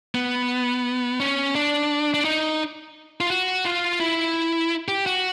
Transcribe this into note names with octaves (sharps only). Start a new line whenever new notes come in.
B3
C#4
D4
D4
D#4
F4
F#4
F4
E4
G4
F#4